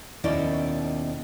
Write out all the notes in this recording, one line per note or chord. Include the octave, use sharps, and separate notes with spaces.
D#2 B2 C#4 D#4 E4 D5